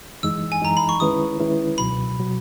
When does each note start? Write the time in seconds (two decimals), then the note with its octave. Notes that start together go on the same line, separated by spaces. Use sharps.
0.23 F#2 E3 G#3 D#4 E6
0.52 G#5
0.62 F#2 E3 G#3 D#4 A#5
0.77 B5
0.89 C#6
1.00 D#3 G#3 C#4 E4 B4 D#6
1.40 D#3 G#3 C#4 E4 B4
1.78 C#2 B2 F#3 B5
2.18 B2 F#3